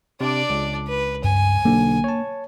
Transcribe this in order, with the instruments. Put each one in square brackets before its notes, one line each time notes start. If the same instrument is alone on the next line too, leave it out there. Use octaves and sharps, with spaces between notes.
[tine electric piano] C3 [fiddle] D4 D5
[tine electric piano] C#2
[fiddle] B4
[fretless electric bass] G2 [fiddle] G#5
[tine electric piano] B1 D3 [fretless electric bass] A#3
[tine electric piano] C#5 A5